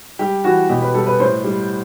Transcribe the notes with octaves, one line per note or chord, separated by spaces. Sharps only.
G3 G4
E3 F#4
B2 G4
B4
G3 A4
B4
A2 C5
G3